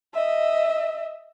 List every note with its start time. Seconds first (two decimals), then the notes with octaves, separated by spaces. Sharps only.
0.14 D#5 E5